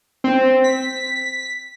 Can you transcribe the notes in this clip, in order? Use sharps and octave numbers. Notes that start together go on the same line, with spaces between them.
C4
B6